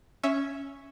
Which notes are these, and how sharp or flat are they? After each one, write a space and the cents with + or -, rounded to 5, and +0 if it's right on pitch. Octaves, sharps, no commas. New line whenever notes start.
C#4 +0 E5 +0